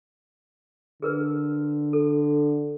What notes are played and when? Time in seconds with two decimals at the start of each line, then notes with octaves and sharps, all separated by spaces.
1.02 D3 G#4 A#4 B4
1.93 A4